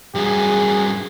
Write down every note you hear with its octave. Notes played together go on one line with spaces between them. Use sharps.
G2 F#3 G#4